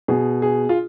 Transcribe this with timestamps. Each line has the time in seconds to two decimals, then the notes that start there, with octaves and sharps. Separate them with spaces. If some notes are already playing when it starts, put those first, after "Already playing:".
0.08 B2 G#4
0.42 G#4
0.69 F4